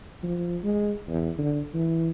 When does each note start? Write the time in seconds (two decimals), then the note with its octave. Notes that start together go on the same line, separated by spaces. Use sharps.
0.23 F3
0.64 G#3
1.08 E2
1.38 D3
1.74 E3